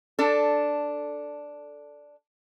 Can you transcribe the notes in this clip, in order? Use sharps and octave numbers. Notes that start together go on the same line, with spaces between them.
D4 A4